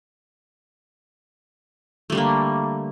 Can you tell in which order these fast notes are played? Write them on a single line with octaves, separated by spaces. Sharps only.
A3 G3 D3 A#3